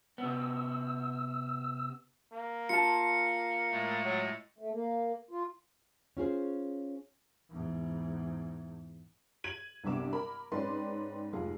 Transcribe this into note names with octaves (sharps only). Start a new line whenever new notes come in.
C3 B3 E6
A#3
F4 A5 C#7
A2 G#3 A3
F#3
A3
A#3
F4
C#4 F4 G#4 C5
E2 G#2
G#6 D#7 F#7
C2 G2 C3 B3 D6 E7
A#4 B5
G#2 C4 C#4 B4 D5 C6
F1 G#2 F4 G#4